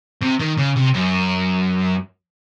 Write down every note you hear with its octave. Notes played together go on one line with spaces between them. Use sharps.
C3
D#3
C#3
C3
F#2